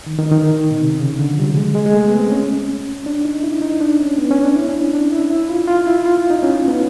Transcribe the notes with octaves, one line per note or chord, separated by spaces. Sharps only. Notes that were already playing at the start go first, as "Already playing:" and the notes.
D#3
D#3
D#3
D#3
B2
C3
C#3
D3
F3
G3
F#3
G#3
G#3
G#3
A3
B3
C4
C#4
D4
D#4
E4
D#4
D4
C#4
B3
C#4
D4
E4
D4
C#4
D4
E4
E4
F4
F4
E4
F4
E4
D#4
C#4
B3